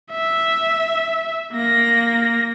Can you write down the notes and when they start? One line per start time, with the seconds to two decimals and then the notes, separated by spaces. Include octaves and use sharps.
0.12 E5
1.52 A#3 A#6